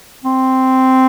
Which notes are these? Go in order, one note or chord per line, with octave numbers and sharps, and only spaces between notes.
C4